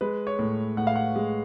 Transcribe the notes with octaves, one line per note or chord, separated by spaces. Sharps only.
G#3 B4
C#5
A2
A2 F#5
F5
F#5
G#3